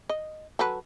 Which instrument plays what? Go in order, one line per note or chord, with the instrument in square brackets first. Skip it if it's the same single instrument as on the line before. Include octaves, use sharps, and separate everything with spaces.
[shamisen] D#5
F#3 A4 B4